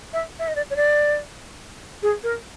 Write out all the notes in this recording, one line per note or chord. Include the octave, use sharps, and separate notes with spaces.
E5
E5
D#5
D5
C#5
D5
G#4
A#4